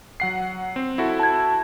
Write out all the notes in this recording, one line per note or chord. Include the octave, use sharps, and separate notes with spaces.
F#3 F#5 C7
C4
E4 F#4 A4
A5 G#6